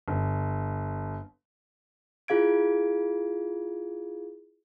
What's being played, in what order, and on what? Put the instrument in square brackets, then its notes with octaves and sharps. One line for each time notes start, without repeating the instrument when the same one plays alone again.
[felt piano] G1
[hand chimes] E4 F4 G#4 F5 G#6 D7